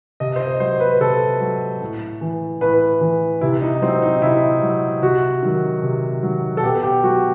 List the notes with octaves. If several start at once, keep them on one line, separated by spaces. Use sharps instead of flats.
C3 D#5
C5
D#5
F#3 C5
B4
C3 A4
F#3
A2
E3
A2 B4
E3
C3 E4
D#4
F#3 C4
D#4
C3 E4
F#3
C3 F#4
D#3 F#3
C3
D#3 F#3
A4
B2 G4
G4
F#3 F#4